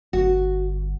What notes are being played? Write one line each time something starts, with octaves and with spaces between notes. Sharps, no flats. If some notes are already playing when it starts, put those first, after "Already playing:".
G1 F#4